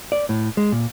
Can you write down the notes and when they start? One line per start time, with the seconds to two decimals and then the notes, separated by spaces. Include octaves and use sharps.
0.12 D5
0.29 A2
0.57 G#3
0.72 A#2